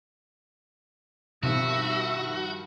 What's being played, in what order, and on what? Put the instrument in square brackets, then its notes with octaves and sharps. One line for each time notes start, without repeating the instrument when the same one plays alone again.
[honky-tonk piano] G2 D#3 F3 [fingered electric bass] B2 C4 [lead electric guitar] F#4 [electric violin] E5